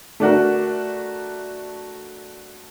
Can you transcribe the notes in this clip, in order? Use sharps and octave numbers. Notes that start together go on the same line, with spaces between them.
A3 D4 F#4 A#4